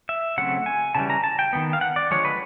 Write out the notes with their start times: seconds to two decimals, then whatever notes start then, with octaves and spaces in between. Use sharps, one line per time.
0.09 E5
0.38 C#3 F#3 A3 C4 F#5
0.66 G#5
0.95 C#3 E3 G3 A5
1.10 A#5
1.24 A5
1.39 G5
1.53 D#3 G3 B3
1.73 F5
1.81 F#5
1.96 D5
2.11 D3 F3 G#3 C#5
2.25 B4